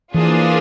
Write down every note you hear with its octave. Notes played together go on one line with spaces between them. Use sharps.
E3 F3 A#3 D4 F4 G#4